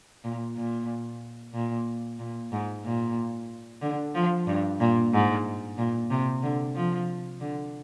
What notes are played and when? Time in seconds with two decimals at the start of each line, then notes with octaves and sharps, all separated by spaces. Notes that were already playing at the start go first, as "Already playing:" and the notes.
0.24 A#2
0.57 A#2
1.54 A#2
2.19 A#2
2.52 G#2
2.85 A#2
3.82 D3
4.15 F3
4.47 G2
4.80 A#2
5.13 G#2
5.78 A#2
6.11 C3
6.43 D3
6.76 F3
7.41 D3